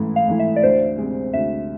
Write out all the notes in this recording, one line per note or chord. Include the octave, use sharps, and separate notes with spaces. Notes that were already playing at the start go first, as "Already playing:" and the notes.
Already playing: A1 G#2 E3 A3 E4
F5
G#2 E3 A3 E4
E5
D5
D2 C5
C3 G#3
D2 E5